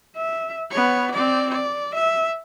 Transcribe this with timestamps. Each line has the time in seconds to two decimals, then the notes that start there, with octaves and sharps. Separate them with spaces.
0.16 E5
0.71 B3 C#5
1.12 C4 D5
1.50 D5
1.95 E5